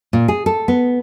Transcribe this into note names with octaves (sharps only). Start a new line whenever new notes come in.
A#2
G#4
A4
B3